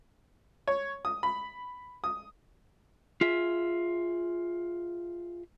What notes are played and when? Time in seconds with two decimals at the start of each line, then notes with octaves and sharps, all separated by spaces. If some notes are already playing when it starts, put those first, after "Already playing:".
0.68 C#5
1.05 D#6
1.23 B5
2.04 D#6
3.21 F4 G#4 E5